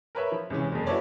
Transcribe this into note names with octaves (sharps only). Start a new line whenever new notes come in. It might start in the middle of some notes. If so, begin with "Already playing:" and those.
A#4 B4 C#5 E5
F3
C#2 C3 E3 C#4
F#1 F2
E4 F#4 A4 B4 C#5 D5